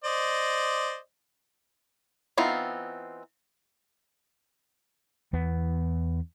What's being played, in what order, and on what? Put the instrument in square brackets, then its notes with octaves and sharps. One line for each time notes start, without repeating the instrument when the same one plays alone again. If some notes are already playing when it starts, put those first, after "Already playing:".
[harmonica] C5 D5 D#5
[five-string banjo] E3 B3 C4 D#4 F4
[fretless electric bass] E2 B3